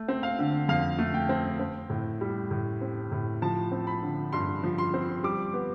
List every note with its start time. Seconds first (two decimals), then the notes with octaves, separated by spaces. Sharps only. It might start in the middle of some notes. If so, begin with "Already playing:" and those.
Already playing: A3
0.08 C4
0.23 F5
0.39 D3
0.69 F2 F5
0.98 A3
1.14 G5
1.29 C4
1.60 C4
1.90 A2
2.21 G3
2.51 A2
2.81 C4
3.12 A2
3.42 F3 A5
3.72 C4
3.87 B5
4.02 D3
4.32 G2 C6
4.63 F3
4.78 C6
4.94 C4
5.23 G3 D6
5.54 B3